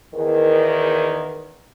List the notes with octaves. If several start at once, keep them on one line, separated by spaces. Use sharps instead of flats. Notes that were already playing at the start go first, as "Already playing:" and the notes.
E2 D#3